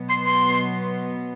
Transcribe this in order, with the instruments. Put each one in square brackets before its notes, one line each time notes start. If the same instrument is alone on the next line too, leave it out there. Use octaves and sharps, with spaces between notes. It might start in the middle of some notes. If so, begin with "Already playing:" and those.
Already playing: [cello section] B2 F#3 B3
[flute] C6
C6